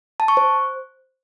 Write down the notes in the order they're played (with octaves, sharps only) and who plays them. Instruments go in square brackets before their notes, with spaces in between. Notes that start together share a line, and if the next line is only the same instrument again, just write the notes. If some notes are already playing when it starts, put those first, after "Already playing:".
[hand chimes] A5
C#6
C5